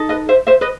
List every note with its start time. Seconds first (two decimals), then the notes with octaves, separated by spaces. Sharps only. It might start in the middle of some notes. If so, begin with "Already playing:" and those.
Already playing: D#4 A4
0.09 B4 D#5
0.29 C5 E5
0.47 C5 E5
0.61 B4 D#5